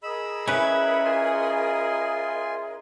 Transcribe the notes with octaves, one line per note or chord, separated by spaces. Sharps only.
G#4 A#4 D#5 B5 E6
C#4 E4 B4
F4 G#5 C6